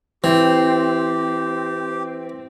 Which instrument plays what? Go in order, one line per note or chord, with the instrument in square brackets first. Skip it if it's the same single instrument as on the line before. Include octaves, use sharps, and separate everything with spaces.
[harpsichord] E3 [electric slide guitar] C4 [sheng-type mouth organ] G4